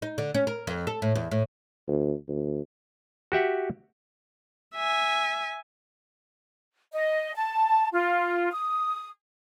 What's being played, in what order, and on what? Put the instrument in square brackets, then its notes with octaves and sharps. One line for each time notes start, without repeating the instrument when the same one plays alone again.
[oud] D#4
D3
C#4
A#4
F2
A4
A2
E2
A2
[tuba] D2
D2
[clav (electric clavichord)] F#4 G4 E5 F#5
[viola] E5 G#5
[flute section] D#5
A5
F4
D#6